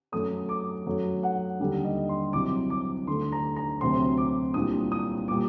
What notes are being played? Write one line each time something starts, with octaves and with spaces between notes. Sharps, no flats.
F#2 F#3 A3 D#6
D6
F#2 F#3 A3
F#5
D#2 D3 G3 D4
D#5
C6
C2 C3 F#3 D6
D6
D2 D3 A3 C6
A#5
A#5
D2 C3 F#3 C4 C6
D6
C2 A#2 G3 D4 D#6
D#6
A#2 G3 D6